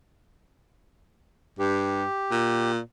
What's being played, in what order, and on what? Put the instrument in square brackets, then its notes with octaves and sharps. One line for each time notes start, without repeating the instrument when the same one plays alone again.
[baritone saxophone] G2 [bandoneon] G4
[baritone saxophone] A#2